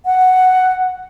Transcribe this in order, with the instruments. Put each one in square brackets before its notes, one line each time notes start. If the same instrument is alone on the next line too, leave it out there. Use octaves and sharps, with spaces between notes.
[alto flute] F#5